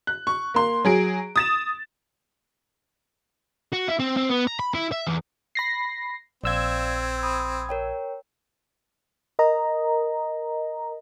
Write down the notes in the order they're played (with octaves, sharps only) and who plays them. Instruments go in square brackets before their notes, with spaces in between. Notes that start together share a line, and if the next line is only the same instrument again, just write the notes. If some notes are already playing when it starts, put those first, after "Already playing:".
[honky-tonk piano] F#6
C#6
A#3 C6
F#3 G#4 D7
D#6 A6 E7
[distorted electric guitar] F#4
E4
C4
C4
B3
A#5
B5
E4
E5
E2
[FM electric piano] B5 A#6 C7
[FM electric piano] A#1 E6 G#6 [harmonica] C4 [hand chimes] D5 F5
[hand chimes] B5 D#6
A#4 C#5 G5
[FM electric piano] A#4 D#5 A#5